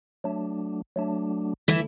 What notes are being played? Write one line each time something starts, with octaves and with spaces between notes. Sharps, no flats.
F#3 A3 D4
F#3 A3 D4
D3 E3 A3 E4